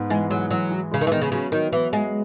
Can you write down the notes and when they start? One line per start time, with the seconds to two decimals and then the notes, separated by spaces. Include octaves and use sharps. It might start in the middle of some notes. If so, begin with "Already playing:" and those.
Already playing: G#2 B3
0.10 E3 G#3
0.30 F#3 G#3
0.50 E3 F#3
0.71 E3
0.91 C#3 G#3
1.01 D#3
1.07 E3
1.11 D#3 B3
1.21 C#3
1.32 C#3 F#3
1.52 D#3 F#3
1.72 E3 B3
1.92 G#3 F#4